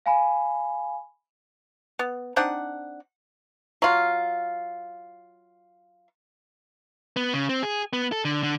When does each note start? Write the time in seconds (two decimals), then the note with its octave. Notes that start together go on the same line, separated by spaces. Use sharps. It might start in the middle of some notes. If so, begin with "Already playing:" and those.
0.06 F5 G#5 B5
1.99 B3
2.36 C4 D4 D#4 F#5
3.82 F#3 F4
7.16 B3
7.33 C#3
7.49 C4
7.63 G#4
7.93 B3
8.12 A4
8.25 D3
8.43 D3